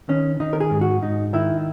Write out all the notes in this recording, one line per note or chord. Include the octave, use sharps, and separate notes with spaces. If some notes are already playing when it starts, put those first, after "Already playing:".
D#3 C#4
D#3 D#4
A#4
G#4
G#2
F#4
G#2 D#4
D#3 E4